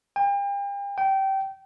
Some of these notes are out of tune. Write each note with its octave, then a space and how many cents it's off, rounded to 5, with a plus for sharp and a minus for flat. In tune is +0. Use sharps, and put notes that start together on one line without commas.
G5 +40
G5 -20